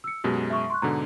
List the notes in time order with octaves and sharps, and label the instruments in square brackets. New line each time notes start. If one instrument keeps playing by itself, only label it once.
[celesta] E6 C#7
[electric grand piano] F#2 B2 G#3 [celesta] G4
[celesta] E5 C#6
C6 C#6 F#6
[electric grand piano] G#2 B2 D3 [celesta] A#5